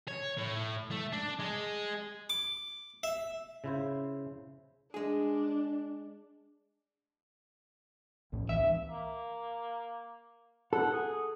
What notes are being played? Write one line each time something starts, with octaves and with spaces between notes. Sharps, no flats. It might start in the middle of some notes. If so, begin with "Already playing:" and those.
C#5
A2
A3
D4
G#3
D6
E5
C#3 E4 C5
G#3 D4 G#4
A#1 A2
C#2 E3 E5
A#3
A4 F#5
G#4